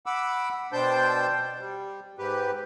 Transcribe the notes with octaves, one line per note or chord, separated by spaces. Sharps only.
F#5 B5 D6 E6
B2 D4 C5 G5 A5 G6
G3
G#2 G4 B4